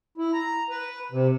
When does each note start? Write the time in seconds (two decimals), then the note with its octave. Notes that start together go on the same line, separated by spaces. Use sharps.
0.18 E4
0.33 A#5
0.70 B4
1.12 C3